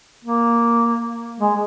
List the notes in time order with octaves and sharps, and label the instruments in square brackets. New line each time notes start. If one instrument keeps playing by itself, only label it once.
[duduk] A#3
G#3